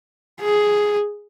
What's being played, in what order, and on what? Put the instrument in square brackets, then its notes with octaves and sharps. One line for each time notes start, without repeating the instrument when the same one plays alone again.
[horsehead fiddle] G#4